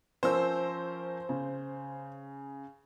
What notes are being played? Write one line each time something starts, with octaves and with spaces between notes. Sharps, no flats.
F3 C#4 A#4 C5 E6
C#3